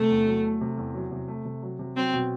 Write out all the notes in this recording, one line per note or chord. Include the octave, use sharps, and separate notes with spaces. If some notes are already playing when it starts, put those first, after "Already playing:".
Already playing: C3 A3
E2
F#3
A3
C3
E2
F#3
C3
A3
C3
F#3
C3
F#3 C4
B2